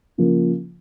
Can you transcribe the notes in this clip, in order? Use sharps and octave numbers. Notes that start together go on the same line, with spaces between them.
C#3 F3 A#3